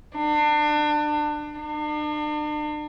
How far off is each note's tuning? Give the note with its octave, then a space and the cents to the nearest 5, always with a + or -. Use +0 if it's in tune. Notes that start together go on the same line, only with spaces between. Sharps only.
D4 +30
D4 +40